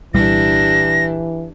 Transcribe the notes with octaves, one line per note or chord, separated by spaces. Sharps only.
C2 A#2 E3 G3 D4 E4 G4 A#6